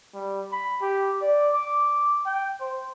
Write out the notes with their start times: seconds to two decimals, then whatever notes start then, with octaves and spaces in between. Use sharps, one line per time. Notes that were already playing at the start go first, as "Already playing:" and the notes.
0.14 G3
0.52 B5
0.81 G4
1.22 D5
1.54 D6
2.26 G5
2.60 C5